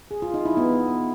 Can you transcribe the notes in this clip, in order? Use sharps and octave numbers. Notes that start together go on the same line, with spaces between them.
G#4
F4
D#4
E4
B3